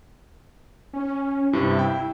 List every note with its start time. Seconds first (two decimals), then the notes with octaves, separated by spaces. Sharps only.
0.93 C#4
1.53 G2 C3 E4
1.79 G5